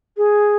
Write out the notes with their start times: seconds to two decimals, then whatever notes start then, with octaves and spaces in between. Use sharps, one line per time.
0.17 G#4